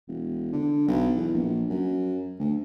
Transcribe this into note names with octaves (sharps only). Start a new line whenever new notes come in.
E1
D3
B1
E2
A#1
F#2
D2